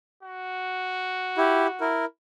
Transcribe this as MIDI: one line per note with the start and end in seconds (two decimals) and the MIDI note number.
0.23 1.92 66
1.37 1.67 64
1.37 1.67 67
1.81 2.05 64
1.81 2.05 70